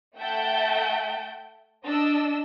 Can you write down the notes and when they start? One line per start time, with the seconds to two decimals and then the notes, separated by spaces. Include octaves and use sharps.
0.18 A3 E5 F#5 G5 A5 G6
1.87 D4 D#5 E6